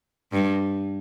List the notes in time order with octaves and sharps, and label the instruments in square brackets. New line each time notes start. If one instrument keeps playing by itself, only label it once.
[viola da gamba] G2